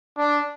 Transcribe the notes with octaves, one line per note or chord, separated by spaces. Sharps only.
D4